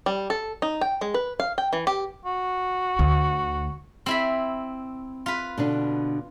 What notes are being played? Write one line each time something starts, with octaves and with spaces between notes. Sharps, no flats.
G3
A4
D#4
G5
G#3
B4
F5
G5
E3
G4
F#4
D2
C4 E4 B5
F4 B4
B2 D3 D4